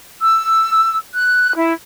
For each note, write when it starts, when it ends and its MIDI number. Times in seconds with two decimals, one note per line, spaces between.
0.21 0.96 88
1.14 1.53 90
1.56 1.73 64